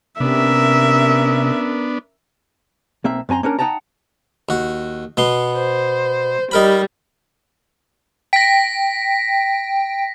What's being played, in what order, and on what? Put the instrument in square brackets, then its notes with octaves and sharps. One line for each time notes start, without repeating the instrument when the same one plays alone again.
[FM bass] C3 [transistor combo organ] B3 D4 [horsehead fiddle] C#4 A#4 [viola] E5
[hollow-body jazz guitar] B1 A#3 C4 E5
F#2 C4 G#5 A#5 C6
A#3 C#4 D4 A#4
D#4 F#5 G5 A5 A#5
[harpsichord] D#2 F#4
B2 B3 C6
[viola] C5
[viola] G3 [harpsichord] D#4 A#4 B5
[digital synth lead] G5 [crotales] A#6 B6